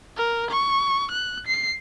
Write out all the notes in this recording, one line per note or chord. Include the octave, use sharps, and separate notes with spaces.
A#4
C#6
F#6
C7